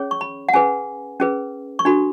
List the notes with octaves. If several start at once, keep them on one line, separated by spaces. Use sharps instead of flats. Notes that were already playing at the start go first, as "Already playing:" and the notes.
Already playing: C#4 G#4 C#5
C#6
B5
F#5
C#4 G#4 B4 G#5
C#4 G#4 B4
C#6
D4 F#4 A4 B5